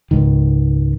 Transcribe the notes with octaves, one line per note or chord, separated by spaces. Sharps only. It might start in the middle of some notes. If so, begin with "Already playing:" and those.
C#2 G#2 D#3